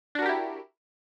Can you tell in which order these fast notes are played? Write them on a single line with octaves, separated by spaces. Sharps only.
D4 F#4 A#4 G4 E4